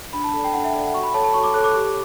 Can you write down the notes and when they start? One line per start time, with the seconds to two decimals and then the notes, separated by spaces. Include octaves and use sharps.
0.13 D4 B5
0.24 A5
0.33 A4 D5
0.44 G5
0.53 D4 F#5
0.64 E5
0.74 A4 D5
0.83 F#5
0.94 F#4 C#6
1.03 B5
1.14 A4 C#5 A5
1.24 A5
1.34 F#4 C#6
1.43 D6
1.54 A4 C#5 F#6
1.64 D6
1.74 G4